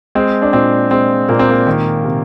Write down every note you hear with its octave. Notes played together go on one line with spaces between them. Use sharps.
G#3 C4
D4
A#2 C4
G#3 C4
A#2 A#3
C4
A#3
D#3
C3